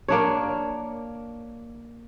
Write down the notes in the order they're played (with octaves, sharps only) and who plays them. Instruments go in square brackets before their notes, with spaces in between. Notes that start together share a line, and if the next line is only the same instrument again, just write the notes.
[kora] A#3 D4 C#5